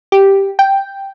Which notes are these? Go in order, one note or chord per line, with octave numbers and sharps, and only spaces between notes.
G4
G5